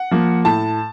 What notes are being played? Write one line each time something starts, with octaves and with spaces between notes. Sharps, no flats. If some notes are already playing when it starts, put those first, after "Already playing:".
Already playing: F#5
F3 A#3
A2 A5